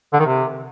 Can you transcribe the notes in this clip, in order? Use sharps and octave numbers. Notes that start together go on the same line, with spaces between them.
D3
D#3
C3